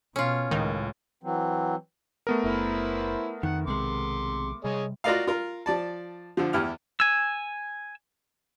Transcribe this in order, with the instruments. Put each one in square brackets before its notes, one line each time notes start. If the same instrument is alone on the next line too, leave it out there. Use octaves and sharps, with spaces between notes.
[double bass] B2 [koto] C#4 F4
[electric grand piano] C#2 [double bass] A2 [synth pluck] D#3
[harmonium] E3 F#3 C4
[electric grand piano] A3 B3 A#4
[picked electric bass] F#1 [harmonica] E4 B4 C5
[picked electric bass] F2 [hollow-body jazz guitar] D#3 [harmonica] F#5
[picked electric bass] B1 D#3 [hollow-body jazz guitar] C3 G#3 [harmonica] C6 D6
[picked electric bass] C3 G3 [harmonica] G#4 C#5 D#5
[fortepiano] F4 F#4 A#4 D5 D#5 F5
F4 A#4
F3 D5 A5
D3 F3
E2 E4 G4 F6
[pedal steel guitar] G#5 E6